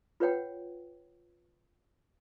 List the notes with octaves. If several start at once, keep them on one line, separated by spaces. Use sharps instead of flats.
F4 B4 C#5 F#5 G5